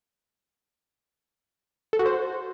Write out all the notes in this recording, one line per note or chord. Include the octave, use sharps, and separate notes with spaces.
A4
F#4
C5